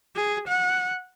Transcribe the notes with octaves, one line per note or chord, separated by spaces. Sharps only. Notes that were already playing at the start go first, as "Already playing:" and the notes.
G#4
F#5